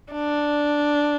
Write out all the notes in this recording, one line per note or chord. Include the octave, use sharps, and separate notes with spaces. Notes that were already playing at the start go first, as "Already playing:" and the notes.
D4